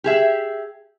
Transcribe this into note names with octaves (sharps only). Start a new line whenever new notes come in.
G4 G#4 E5